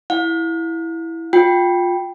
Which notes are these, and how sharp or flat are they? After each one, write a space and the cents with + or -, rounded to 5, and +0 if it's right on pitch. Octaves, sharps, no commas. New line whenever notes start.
E4 +0 F5 +45
F4 +20 G5 +0